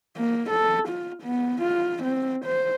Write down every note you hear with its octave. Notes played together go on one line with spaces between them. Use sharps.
A#3
A4
F4
B3
F4
C4
C5